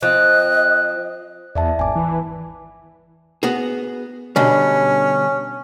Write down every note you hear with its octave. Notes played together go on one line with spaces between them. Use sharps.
F3 C4 D#5 F#6
E2 D5 E5 A5
G#1 G#5 D6
E3
B3 F#4 G#4
B2 D3 G3 C#4